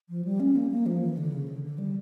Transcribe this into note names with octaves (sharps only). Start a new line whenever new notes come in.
F3
G3
C#4
A#3
A#3
F3
E3
D3
C#3
D3
D3
G3